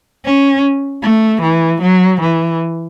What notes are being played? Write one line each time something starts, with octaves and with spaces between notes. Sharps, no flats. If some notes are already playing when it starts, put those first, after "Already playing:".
C#4
A3
E3
F#3
E3